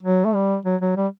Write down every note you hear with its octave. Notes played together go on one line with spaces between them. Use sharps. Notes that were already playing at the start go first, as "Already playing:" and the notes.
F#3
A3
G3
F#3
F#3
G3